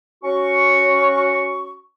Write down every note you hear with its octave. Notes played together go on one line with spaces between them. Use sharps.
C#4 F#4 C#6